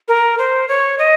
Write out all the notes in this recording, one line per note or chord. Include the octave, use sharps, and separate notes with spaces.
A#4
C5
C#5
D#5